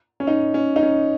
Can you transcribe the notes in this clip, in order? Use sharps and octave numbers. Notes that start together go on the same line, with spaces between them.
C#4
D#4
C#4
D#4
C#4